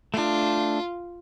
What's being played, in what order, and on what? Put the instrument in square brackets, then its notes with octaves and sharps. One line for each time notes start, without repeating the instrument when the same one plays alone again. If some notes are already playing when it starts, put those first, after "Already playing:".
[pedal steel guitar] A3 D4 [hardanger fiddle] F4